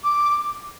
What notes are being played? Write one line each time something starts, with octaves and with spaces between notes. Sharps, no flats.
D6